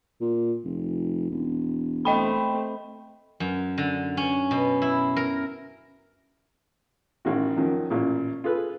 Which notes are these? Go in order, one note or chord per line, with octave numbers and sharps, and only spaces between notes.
A#2
F1
E1
A3 C4 D#5 G5 B5
F#2
D3
C#4
B2
E4
A#4
A1 D#3 F#4
F#2 D#3 F3
A1 A#2
F4 G#4 A4 B4